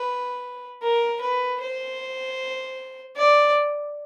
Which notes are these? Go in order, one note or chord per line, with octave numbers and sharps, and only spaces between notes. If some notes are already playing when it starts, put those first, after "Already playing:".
Already playing: B4
A#4
B4
C5
D5